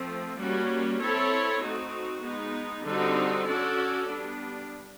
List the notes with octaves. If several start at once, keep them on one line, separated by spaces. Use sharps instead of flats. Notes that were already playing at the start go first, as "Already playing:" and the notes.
Already playing: F3 A3 C4
G3 A#3 C#4 F#4
C4 E4 A4 C#5
A3 C4 D#4 F#4
G#3 B3 D#4
D3 G3 C4 D#4 F#4
C#4 F#4 A4 D5
G3 B3 D4